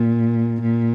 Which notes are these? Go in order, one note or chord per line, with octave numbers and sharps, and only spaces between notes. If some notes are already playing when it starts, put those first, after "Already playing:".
Already playing: A#2
A#2